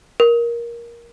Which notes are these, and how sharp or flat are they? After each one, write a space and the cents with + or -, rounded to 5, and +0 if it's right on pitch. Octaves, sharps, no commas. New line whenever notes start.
A#4 +15